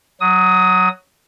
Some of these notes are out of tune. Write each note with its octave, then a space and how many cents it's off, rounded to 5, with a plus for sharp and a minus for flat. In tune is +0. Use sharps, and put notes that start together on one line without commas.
F#3 +0 D#6 +20